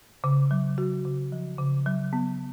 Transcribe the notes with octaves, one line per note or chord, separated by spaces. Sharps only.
C#3
F#3
F#4
C#3
F3
C#3
F#3
B3